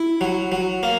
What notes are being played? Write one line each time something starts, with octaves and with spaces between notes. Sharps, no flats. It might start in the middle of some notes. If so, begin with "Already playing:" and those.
Already playing: E4
F#3
F#3
A#3